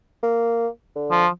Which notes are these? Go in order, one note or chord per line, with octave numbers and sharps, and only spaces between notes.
A#3
D3
F3